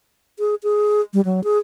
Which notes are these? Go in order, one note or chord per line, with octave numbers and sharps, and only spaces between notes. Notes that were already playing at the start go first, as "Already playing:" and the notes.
G#4
G#4
G3
F#3
G#4